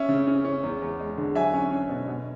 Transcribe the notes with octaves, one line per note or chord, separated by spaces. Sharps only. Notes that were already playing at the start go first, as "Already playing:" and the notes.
Already playing: C#4 E5
C#3
C#4
C#4
E2
E2
G#3
D3
F#3 E5 G#5
C#4
C#4
B2
B2